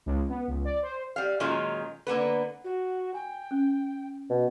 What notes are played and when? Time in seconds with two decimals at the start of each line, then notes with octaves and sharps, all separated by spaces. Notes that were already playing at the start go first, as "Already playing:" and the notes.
0.06 C#2
0.29 B3
0.48 C#2
0.65 D5
0.83 C5
1.16 G3 F5
1.40 A#2 D#3 F#3 G#3 C#4 F4
2.07 D3 A#3 B3 B4
2.64 F#4
3.14 G5 G#5
3.51 C#4
4.30 B2